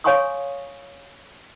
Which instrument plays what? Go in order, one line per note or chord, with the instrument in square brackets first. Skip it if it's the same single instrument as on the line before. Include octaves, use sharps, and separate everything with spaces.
[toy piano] C#5 F5 G#5 C6 C#6 D#6